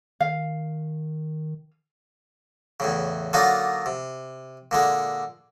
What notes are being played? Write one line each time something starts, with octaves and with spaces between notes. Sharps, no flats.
D#3 F5
E2 A2 C#3
D3 F#3 A#3 D4 D#4 F4
C3
A#2 D3 G#3